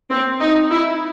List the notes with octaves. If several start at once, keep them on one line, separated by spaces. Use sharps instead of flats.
C4
D#4
E4